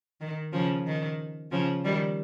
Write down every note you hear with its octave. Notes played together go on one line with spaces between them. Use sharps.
D#3
C#3 F3
D#3
C#3 F3
D#3 G3